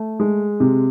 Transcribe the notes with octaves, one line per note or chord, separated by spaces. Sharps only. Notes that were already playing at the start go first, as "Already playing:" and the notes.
Already playing: A3
G#3
C3